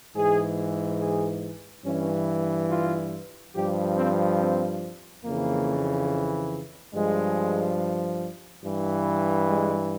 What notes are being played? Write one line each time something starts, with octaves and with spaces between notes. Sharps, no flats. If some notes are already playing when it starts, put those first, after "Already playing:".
G#2 E3 G#4
G#4
G2 E3 C#4
F4
G2 F3 G4
C4
C4
F2 C#3 E3 A#3
G2 F3 G#3
G2 E3
G#3